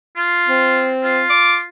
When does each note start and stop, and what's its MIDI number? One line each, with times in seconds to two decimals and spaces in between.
0.16 0.89 65
0.47 1.23 60
1.03 1.64 65
1.30 1.56 86